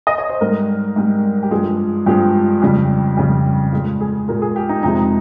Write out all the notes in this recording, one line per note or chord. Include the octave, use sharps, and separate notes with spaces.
D#5
C#5
C5
G#2 G3 A#4
G#2 G3
G4
G2 F3 G#3 G#4
G2 F3 G#3 G4
F2 C#3 G3
F2 C#3 G3
A#2 G#3 F4
G#4
A#2 G#3 A#4
G#4
G4
D#4
F2 C3 F3 G#3 D#4